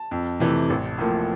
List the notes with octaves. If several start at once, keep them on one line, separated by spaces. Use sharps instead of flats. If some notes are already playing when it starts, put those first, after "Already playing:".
Already playing: A5
F2
C3 E3 A3
A1
A2 F3 A#3